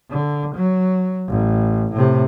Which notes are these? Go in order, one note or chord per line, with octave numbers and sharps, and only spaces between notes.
D3
F#3
A1
A2 C3